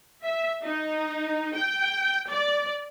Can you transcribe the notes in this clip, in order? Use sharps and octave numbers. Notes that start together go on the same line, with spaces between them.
E5
D#4
G5
D5